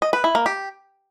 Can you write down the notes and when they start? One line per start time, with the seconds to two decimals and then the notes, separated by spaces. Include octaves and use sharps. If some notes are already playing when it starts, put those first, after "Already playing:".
0.02 D#5
0.13 B4
0.24 E4
0.35 A#3
0.46 G4